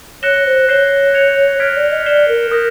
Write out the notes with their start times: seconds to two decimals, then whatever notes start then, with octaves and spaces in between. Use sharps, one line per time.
0.23 C#5 F#6 A#6 C#7 E7 G7
0.46 C5
0.69 C#5 G6 C7 E7 G7
1.14 G#6 C#7 F7
1.60 C#5 F6 G#6 B6 D7
1.76 D5
1.90 D#5
2.06 D5 G6 C7 E7 G7
2.28 A#4
2.51 A#4 D#6 G6 A#6